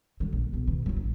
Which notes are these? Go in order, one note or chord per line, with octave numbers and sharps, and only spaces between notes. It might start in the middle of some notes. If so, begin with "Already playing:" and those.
D3 F#3
A#1
B1
B2 D#3
F#3 E4
A1